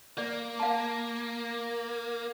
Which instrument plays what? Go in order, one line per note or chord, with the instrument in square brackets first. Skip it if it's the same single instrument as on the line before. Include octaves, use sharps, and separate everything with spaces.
[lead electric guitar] A#3 [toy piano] D5
[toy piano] F5 A5